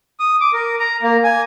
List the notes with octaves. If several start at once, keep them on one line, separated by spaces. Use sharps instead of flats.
D#6
D6
A#4
A#5
A#3
G#5